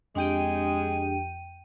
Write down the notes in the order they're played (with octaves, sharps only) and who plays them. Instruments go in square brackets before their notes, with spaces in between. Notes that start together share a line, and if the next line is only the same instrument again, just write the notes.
[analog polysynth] F2 G5 D#7 [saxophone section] G#3 [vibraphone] D4 G4